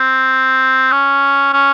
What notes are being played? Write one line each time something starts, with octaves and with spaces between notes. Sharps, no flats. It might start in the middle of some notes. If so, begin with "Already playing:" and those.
Already playing: C4
C#4
C#4